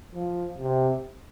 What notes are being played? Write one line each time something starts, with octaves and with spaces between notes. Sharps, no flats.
F3
C3